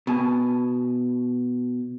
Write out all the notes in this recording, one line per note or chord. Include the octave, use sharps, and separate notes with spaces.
B2 G#5 A5